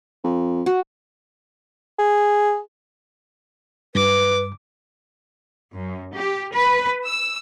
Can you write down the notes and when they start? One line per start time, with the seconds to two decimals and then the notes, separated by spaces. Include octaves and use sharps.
0.24 F2
0.66 F#4
1.99 G#4
3.95 G2 B4 D6
5.74 F#2
6.14 G4
6.54 B4
7.05 E6